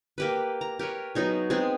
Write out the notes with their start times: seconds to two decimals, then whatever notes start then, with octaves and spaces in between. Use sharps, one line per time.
0.18 A#3 G4 B4
0.61 A#5
0.79 G4 A#4 B4 C#5
1.15 F#3 B3 D#4 G#4
1.50 G#3 B3 C4 G#4